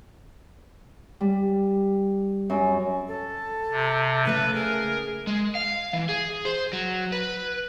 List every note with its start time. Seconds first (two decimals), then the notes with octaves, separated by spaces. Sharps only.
1.21 G3
2.50 F#2
3.08 A4
3.71 C3
4.25 C#3 A3 A4 B4 E5
4.54 G#4 A#4
5.27 G#3
5.55 F5
5.93 E3
6.09 G#4
6.45 C5
6.73 F#3
7.12 B4